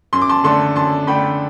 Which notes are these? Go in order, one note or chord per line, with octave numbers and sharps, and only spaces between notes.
F#2 C6
D6
A5 C6
D3 A3 D4 A5 C6
F#2 A5 C6
D3 A3 D4 G5 B5